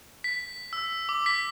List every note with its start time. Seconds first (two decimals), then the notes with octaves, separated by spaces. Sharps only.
0.24 B6
0.73 E6
1.09 D6
1.26 B6